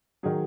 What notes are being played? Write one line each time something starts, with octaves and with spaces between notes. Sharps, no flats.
D#3 F#3 G#4